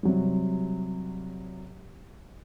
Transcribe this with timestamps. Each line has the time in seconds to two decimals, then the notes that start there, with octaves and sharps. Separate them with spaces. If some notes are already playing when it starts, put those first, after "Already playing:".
0.03 C3 F#3 G3